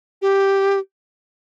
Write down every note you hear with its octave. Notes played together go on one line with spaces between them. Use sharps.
G4